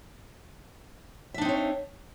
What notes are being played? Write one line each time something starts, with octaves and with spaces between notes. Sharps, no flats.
C4 D4 D#4 C#5 E5